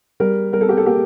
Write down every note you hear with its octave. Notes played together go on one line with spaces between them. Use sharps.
G3 A#4
G3 A#4
A4
G4
A4
A#3 G4